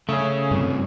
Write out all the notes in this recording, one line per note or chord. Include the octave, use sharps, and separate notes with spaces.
C#3 A3 C#4
G2 C3